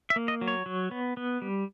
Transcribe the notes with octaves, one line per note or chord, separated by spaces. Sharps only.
E5
A#3
D#5
F#3
C#5
F#3
B3
B3
G3